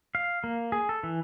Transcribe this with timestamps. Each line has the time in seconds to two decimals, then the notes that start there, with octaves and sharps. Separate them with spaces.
0.15 F5
0.44 A#3
0.72 G#4
0.89 A4
1.03 E3